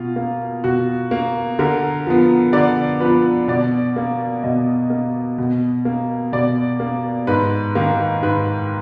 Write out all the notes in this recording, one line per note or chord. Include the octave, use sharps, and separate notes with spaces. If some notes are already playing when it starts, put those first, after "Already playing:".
Already playing: B2 F4
A#3
B2 F#4
A#3
D3 A#4
F3 B3
D3 D5
F3 B3 B4
B2 D5
A#3
B2 D#5
A#3
B2
A#3
B2 D5
A#3
G#2 B4
D#3 A#3
G#2 B4